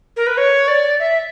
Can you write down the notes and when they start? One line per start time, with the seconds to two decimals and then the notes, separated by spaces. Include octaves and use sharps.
0.17 A#4
0.27 B4
0.38 C#5
0.68 D5
0.99 E5